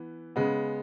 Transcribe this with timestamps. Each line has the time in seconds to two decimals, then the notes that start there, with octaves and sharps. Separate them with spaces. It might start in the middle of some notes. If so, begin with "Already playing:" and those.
Already playing: E3 B3
0.36 C#3 G#3 B3